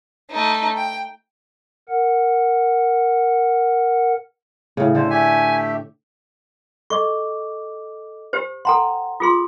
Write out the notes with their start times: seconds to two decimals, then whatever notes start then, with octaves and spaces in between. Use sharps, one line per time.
0.31 A3 D#4
0.76 G5
1.89 A#4 F#5
4.77 A2 C#3
4.95 D3 A4 C5
5.10 A3 G4 E5 G#5
6.90 A4 D#5 C#6 D6
8.33 G4 C5
8.65 A4 F#5 G5 A#5 C6
9.20 F4 G#4 C6 D#6